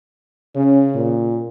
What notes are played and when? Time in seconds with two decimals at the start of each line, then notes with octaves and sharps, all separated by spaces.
0.55 C#3 C#4
0.95 A#2